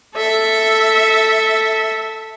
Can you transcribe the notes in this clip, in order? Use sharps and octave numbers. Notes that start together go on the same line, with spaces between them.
A4 E5